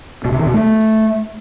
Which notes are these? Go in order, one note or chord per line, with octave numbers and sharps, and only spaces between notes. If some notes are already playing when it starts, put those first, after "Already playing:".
B2
C3
D#3
B2
A3